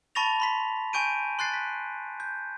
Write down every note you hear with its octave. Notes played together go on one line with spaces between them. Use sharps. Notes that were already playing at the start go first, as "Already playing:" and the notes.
A5 B5 C#6 A6 A#6 F7
B5 C6 B6
G#5 C#6 G6 D7 D#7
C6 F#6 A6 C7
B6
G6